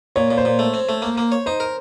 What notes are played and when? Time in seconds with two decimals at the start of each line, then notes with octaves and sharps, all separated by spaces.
0.16 A#2 C#5
0.31 A#2
0.38 C5
0.45 A#2
0.59 A3
0.74 C4
0.89 A3
1.02 A#3
1.18 A#3
1.32 C#5
1.46 D#4 C5
1.60 A#4